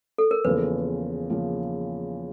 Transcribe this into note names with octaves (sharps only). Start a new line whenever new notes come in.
A4
A#4
E2 C#3 F3 A#3 B4
C#3 F3 A#3